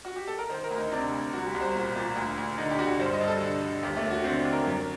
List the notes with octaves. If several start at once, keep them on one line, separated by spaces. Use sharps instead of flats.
F#4
G4
A4
A#4
D#3 C5
A#4
D2
D#4
C3 D4
D2
C2 F#4
G4
C2
C5
A#2
A#2
D2
D2
D3 D#4
G4
D3 F#4
G2 C5
D#5
G2
A4
D3
D3
D#2 G4
A3
D#2
F#4
D3 C4
C4
D3
A#4
F#2